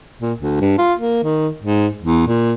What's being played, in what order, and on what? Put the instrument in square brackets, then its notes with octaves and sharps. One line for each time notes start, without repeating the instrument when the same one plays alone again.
[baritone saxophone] A#2
D2
G2
F4
A#3
D#3
G#2
E2
A#2